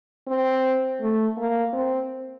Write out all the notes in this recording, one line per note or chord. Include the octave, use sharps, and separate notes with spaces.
C4
A3
A#3
C4